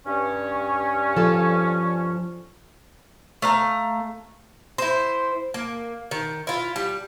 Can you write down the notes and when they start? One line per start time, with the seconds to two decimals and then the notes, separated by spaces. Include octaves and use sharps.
0.07 G2 C#4
1.16 F3 A4
3.42 A3 F5 A#5
4.78 E4 C5
5.54 A#3
6.11 D#3
6.47 E4 F4
6.76 G3